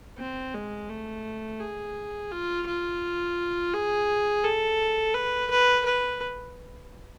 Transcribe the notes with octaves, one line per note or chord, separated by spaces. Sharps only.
C4
G#3
A3
G#4
F4
F4
G#4
A4
B4
B4
B4